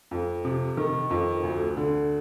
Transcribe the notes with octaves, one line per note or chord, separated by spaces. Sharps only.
F2
C3
D#3
F2
D2
D3